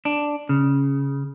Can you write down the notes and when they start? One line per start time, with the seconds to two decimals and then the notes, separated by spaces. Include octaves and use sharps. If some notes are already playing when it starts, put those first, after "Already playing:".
0.05 D4
0.49 C#3